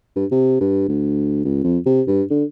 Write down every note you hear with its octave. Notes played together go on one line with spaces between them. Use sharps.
G2
C3
G2
D2
C#2
F2
C3
G2
D3